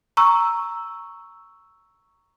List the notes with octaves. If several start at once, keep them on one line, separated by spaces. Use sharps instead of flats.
A#5 C#6 E6